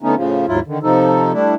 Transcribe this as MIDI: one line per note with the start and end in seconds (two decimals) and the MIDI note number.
0.02 0.15 50
0.02 0.15 57
0.02 0.15 59
0.02 0.15 61
0.02 0.15 63
0.16 0.46 45
0.16 0.46 49
0.16 0.46 53
0.48 0.60 39
0.48 0.60 44
0.48 0.60 54
0.48 0.60 64
0.48 0.60 65
0.67 0.78 50
0.67 0.78 51
0.83 1.32 48
0.83 1.32 53
0.83 1.32 63
0.83 1.32 69
1.33 1.55 55
1.33 1.55 57
1.33 1.55 62
1.33 1.55 64